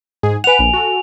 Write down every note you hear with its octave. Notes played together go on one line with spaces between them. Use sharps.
G#2 G#4
B4 F#5 G#5 F7
A#1
F#4 A4